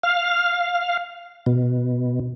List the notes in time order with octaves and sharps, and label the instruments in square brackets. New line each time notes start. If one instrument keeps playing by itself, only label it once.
[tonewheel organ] F5
B2